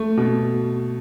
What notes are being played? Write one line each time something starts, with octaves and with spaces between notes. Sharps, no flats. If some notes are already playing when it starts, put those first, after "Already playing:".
Already playing: A3
B2